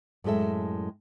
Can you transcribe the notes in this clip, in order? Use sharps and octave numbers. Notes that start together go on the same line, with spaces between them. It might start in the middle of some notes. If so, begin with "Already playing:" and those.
F#2 A2 G#3 A4 E5